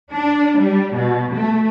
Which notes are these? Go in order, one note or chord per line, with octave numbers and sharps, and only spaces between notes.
D4
G3
B2
A3